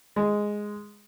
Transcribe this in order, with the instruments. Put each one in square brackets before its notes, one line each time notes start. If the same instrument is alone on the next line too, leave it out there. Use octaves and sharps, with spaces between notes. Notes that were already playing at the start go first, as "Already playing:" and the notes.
[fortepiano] G#3